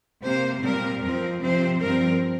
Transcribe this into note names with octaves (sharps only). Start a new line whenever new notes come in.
C3 A#3 C5
A#2 G3 C4 A#4
F2 F3 C4 A#4
C3 F3 C4 C5
G2 F3 C4 A#4